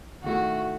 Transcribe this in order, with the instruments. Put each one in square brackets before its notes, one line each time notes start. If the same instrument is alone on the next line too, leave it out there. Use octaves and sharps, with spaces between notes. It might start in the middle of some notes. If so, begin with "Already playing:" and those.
[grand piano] D#3 A3 E4 [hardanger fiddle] F#4